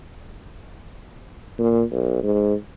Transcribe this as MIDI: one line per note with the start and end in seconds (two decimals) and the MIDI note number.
1.59 1.82 46
1.91 2.19 35
2.23 2.54 44